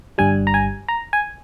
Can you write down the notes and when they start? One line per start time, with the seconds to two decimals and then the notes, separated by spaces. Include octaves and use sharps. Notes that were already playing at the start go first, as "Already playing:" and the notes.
0.18 G1 G2 G3 G#5
0.47 A#5
0.54 G#5
0.88 A#5
1.13 G#5